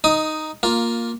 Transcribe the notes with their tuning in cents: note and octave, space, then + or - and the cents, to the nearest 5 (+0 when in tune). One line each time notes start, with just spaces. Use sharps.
D#4 +0 D#6 +15
A#3 +0 F4 +15